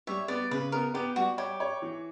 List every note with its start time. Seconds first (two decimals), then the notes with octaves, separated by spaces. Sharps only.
0.07 G3 C#5 E5
0.28 B3 D5
0.51 C#3 B4
0.72 B3 A#4
0.94 B3 G4
1.16 G3 F#4
1.38 G4 C#5
1.60 C#5
1.82 E3